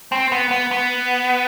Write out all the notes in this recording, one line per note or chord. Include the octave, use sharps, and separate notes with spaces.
C4
B3
B3
B3